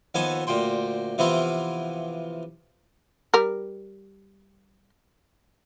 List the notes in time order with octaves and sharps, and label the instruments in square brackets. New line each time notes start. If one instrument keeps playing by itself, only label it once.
[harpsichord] D#2 F3 B3 A4 G#5 A5
D2 A#2 G5 C6
C3 E3 F3 B3 E4 F4
[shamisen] G3 A#4